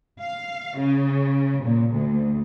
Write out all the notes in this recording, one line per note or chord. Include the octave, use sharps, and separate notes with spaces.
F5
C#3
A#2
D2